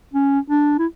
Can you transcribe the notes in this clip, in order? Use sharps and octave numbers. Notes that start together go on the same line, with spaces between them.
C#4
D4
E4